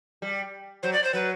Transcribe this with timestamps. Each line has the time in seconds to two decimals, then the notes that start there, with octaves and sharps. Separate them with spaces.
0.22 G3
0.83 F#3 C5
0.93 D5
1.04 C5
1.13 F#3 B4